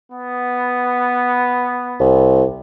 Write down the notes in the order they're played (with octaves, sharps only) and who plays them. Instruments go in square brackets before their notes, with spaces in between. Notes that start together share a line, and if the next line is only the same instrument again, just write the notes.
[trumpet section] B3
[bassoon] C2